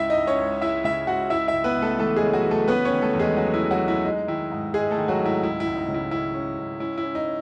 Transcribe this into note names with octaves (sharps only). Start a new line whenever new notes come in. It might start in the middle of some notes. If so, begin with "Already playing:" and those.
Already playing: C#2 E4 E5
D#4 D#5
C#2
C#4 C#5
C#2
G#3 E4 E5
C#3 E4 E5
C#2 F#4 F#5
C#2 E4 E5
E4 E5
C#2
B3 B4
C#2
A3 A4
E3 A3 A4
G#3 G#4
C#3
F#3 F#4
E3
A3 A4
B3 C#4 B4
C#4 C#5
D#3
A3 A4
E2
G#3 G#4
F#3 C#4 F#4
E4
G#3
F#3 F#4
G#3
E4
G#3 D#4
D#3 E4
G#2
G#2 G#3 G#4
A3 A4
D#3
F#3 F#4
G#2
E4
C#2 E4
E4
C#2
D#4
C#3
E4
C#4 E4
C#4
C#2
C#4 E4
E4
C#4
D#4
C#4